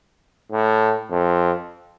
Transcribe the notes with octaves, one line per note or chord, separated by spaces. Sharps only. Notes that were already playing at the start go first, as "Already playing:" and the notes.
A2
F2